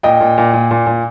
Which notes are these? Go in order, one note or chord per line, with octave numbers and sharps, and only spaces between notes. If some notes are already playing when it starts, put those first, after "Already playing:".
A#2 D#5 G5
A#2
A#2
A#2
A#2
A#2